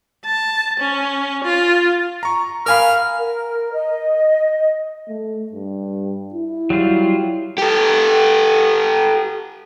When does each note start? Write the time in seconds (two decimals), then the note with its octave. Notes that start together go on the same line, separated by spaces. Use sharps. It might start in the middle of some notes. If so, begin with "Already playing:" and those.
0.25 A5
0.80 C#4
1.44 F4
2.23 A#5 C#6
2.66 A#4 F5 F#5 G#5 B5 D#6 F6
3.18 A#4
3.72 D#5
5.08 A3
5.53 G2
6.34 E4
6.70 F#3 G3 F4
7.58 G4 A4